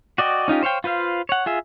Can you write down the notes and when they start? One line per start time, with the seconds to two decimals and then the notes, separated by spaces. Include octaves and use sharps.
0.18 F#4 D5 D#5 G5
0.48 C#4 D#4 F4 G4
0.63 C5 C#5 F5 G5
0.84 F4 B4 C5 F5
1.29 C#5 F#5
1.46 F4 G#4 E5